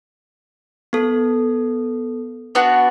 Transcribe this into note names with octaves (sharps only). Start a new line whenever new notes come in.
B3 A4
B3 D4 F#4